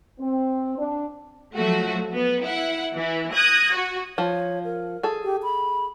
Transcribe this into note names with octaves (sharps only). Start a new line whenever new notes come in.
C4
D4
F3 F#3 A3 F#4
B3
E4 F#5
E3 E4
D#6 F#6 G#6 A#6
F#4
F3 C#5
A#4
G#4 A4
G4
B5